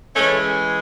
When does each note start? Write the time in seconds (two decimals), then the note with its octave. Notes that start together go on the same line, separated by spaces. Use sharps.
0.15 C#3 E3 G#3 A3 C#4